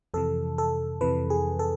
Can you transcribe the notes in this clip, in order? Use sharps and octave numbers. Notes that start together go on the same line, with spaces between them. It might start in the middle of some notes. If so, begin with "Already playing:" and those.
F2 C3 E3 A4
A4
F2 C3 E3 B4
G#4
A4